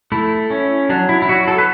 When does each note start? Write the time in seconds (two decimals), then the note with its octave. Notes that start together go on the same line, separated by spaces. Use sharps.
0.12 A3 E4
0.50 C#4
0.90 F#3 D4
1.09 E4
1.22 E4
1.29 F#3 F#4
1.48 A4
1.58 B4